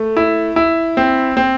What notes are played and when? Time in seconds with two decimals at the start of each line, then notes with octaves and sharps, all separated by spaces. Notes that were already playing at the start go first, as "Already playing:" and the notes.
Already playing: A3
0.17 E4
0.56 E4
0.97 C4
1.37 C4